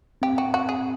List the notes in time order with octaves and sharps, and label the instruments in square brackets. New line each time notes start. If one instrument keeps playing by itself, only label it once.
[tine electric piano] C4 [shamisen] G4
[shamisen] F#4
F#4
G#4